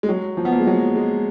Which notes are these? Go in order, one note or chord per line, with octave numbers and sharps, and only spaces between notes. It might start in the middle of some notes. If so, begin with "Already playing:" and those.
G#3
F#3
F3
B3
A#3
G#3
F#3
G#3